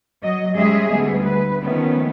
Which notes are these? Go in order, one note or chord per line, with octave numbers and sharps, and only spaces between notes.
F#3 D#5
G3 G#3 C#4 G#4 D#5 E5
D2 G3 B3
B4
D#3 F3 A3 B3 C#4